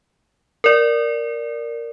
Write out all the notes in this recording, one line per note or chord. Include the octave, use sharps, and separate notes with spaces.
A#4 D5